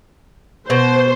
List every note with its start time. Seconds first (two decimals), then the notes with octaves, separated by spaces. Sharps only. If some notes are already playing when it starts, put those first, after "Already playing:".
0.70 B2 C5